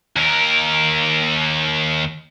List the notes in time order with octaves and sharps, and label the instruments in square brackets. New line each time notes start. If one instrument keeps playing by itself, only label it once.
[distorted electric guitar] D#2 A#4